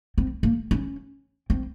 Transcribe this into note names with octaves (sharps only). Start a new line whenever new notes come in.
C4
A#3
C#4
C4